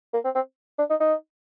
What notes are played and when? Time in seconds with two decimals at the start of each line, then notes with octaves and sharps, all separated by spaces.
0.14 A#3
0.25 C4
0.35 C4
0.79 D4
0.90 D#4
1.01 D#4